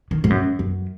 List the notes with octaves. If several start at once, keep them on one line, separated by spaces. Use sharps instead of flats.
D#3
G#2
F#2
F#2